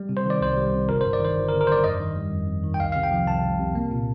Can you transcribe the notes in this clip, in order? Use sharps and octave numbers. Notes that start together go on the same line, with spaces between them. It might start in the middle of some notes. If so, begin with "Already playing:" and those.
Already playing: G3
C3
C5
D#3 D5
C2 C5
G3
C3
G1 A#4
C5
G2
D5
D#3 C5
G1
A#4
G1
A#4
G2 C5 D5
F2 D#5
D#3
G3
F2
F2
D#3
G5
C2 F5
C3 F5
G5
F3
C2 A5
C2
C3
A#3
A#2